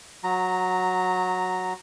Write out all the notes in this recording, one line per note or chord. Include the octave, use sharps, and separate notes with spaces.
F#3 A#5